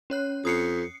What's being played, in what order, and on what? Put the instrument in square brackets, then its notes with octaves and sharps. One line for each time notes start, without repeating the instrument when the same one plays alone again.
[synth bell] C#4 C#5 F#6
[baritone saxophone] F2 [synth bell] D#6 C7 C#7